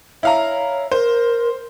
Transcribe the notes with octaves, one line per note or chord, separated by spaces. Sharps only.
E4 C#5 F5 A#5
A#4 C5